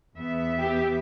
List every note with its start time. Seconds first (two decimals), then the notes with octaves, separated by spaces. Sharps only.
0.16 E2 B3 E5
0.60 G4